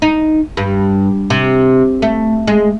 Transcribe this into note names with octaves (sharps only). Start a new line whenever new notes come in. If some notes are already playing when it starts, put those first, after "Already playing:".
D#4
G2
C3
A3
G#3